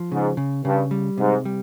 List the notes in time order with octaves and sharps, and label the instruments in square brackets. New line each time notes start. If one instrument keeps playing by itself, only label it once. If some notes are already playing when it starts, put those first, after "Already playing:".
Already playing: [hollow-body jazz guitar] F3
[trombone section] G#2 [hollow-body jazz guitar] C#3
[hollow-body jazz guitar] C#3
[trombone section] G2 [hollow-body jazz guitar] C#3
[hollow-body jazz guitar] G3
[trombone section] G#2 [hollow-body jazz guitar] C3
[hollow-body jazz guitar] G3